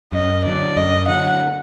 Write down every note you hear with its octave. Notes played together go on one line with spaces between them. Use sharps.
F#2 D#5
D3 F#3 D5
F#2 D#5
D3 F#3 F#5